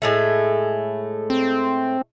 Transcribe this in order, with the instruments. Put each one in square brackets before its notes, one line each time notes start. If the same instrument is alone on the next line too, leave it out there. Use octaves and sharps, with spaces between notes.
[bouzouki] A2 G#3 A3
[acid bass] C4